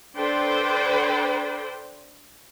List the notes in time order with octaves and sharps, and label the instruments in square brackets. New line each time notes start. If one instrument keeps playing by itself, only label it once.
[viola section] D4 A4 B4 C5 G5